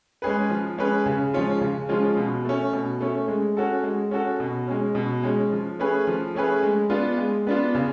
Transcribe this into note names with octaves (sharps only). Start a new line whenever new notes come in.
G#3 C#4 G#4 B4
F3
G#3 C#4 G#4 B4
C#3
F3 G#3 C#4 F4
C#3
F3 G#3 C#4 F4
B2
A3 C#4
B2
A3 C#4
G#3
C#4 F#4 A4
G#3
C#4 F#4 A4
B2
G#3 C#4
B2
G#3 C#4
F3
A3 C#4 G#4 B4
F3
A3 C#4 G#4 B4
G#3
B3 D4 F4
G#3
B3 D4 F4
C#3